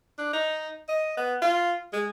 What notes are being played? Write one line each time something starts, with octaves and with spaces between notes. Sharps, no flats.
D4
D#4
D#5
B3
F4
G#3